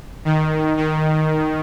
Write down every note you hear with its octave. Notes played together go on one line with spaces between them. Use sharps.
D#3
D#3